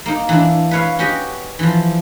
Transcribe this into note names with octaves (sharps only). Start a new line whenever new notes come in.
A#3 D#4
E3 D4
B4 C#5 F5
C#4 F#4 G4 D#5
E3 F3